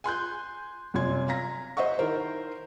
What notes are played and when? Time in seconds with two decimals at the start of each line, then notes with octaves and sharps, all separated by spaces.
0.04 G#5 C6 F#6 G6
0.94 G1 F#2 C3 C#4 C6 G#6
1.28 F5 A#5 A#6
1.77 C5 D#5 E5 F#5 C#6
1.99 D#3 E4 A#4 C5